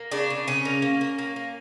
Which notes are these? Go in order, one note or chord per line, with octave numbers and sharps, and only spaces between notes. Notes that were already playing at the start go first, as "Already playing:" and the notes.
Already playing: A#3
C#3 D4
C#3
C#3 C#4
A#3
A#3
A#3
A#3
A#3